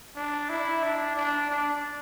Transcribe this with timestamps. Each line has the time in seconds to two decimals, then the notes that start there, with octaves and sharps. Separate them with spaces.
0.16 D4
0.50 E4
0.83 D4
1.16 D4
1.50 D4